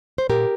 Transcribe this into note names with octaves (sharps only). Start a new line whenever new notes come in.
C5
A#2 G4 A#4